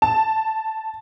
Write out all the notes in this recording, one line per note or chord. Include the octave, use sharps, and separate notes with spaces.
A5